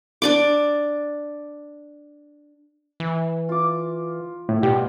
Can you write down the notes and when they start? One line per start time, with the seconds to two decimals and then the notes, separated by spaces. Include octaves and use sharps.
0.22 D4 D5 D6
3.00 E3
3.49 F4 D6
4.49 A2
4.63 B2 G3 F4 G4